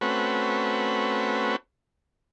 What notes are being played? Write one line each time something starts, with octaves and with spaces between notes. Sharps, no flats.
A3 C4 C#4 F#4 B4